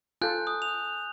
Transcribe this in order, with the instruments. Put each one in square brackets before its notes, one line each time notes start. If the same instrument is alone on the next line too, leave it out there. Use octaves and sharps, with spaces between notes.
[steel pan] F4 A4 [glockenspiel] G#5 F#6 G6
[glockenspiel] D#6
F7